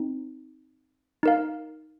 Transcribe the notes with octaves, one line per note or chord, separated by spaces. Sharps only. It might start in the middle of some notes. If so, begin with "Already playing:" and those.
Already playing: C4 D#4
D#4 A#4 F5